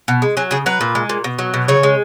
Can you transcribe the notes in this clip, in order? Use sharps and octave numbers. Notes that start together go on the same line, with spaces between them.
B2
G#3
F#3 G#4
C#3 G#4
F#3 B4
A#2
G#3
A#2
B2
F#3
B2
C#3 C#5
G#3